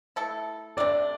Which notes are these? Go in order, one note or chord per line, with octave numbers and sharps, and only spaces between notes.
A3 E4 A4
C3 A3 D4 D5